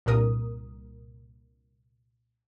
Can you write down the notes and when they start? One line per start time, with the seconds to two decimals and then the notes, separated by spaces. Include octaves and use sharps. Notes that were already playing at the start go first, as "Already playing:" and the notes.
0.06 C2 G2 A#2 A#4 D#6